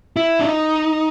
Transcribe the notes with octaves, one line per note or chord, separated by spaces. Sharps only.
E4
D4
D#4